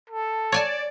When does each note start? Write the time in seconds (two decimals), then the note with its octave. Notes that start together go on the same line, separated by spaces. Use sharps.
0.10 A4
0.52 C#5 D5 G#5 A5